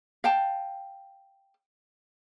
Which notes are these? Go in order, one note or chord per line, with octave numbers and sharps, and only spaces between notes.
F5 G5 A5